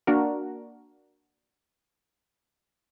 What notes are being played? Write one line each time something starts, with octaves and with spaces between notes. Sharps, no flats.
A#3 D4 F#4 A#4